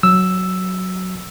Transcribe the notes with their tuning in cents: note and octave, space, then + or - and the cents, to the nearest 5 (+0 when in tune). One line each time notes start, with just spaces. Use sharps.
F#3 +0 E6 +0